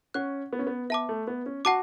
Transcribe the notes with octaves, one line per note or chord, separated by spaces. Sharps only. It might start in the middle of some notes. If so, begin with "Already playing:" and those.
C#4 F#5 C#6 F#6
B3
C#4
B3
B3 E5 A5 D6
A3
B3
C#4
F#4 F#5 A5 D6